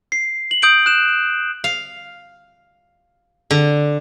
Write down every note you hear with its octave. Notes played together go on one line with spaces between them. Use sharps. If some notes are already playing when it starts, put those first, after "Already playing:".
C7
F#7
D#6 G6 D7 F#7
F#6 E7
F5
D3